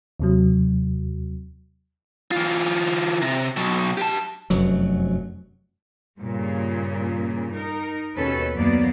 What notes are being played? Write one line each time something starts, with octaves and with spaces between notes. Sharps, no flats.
D#2 C3 F#3
E3 F4
C3
B2 F#3
G4 A5
F1 F#2 F#3
G2 A#2 C#3
D#4 A#4
D#2 B2 C#4 A4 B4
F#2 D#3 F#3 A#3 B3 D5